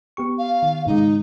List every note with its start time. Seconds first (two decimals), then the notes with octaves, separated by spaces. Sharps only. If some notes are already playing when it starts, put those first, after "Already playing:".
0.17 B3 G4 C#6
0.38 F5
0.63 D#3
0.87 G#2 C#3 G#3 D#4